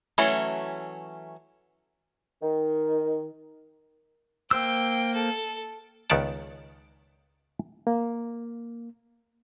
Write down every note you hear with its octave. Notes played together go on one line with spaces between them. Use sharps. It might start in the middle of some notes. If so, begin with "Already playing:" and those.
E3 F#3 A3 C#4
D#3
A#3 C5 G5 E6
A4
C#2 D#3 B3 C#5 D5 A5
A#3